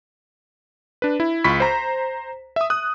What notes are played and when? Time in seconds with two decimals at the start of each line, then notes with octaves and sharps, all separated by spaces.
1.02 D4 B4
1.20 E4
1.44 C#2 F4 B5 C#6 B6
1.60 C5 A#5
2.56 E5 D#6
2.70 D#6 F#6